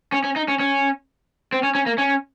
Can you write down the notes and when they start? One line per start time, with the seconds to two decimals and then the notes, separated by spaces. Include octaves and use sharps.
0.12 C#4
0.24 C#4
0.36 D#4
0.48 C#4
0.60 C#4
1.53 C4
1.63 C#4
1.75 C#4
1.86 A#3
1.98 C#4